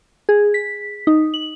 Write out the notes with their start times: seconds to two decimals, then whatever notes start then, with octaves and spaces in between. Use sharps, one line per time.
0.29 G#4
0.54 B6
1.07 D#4
1.34 F#7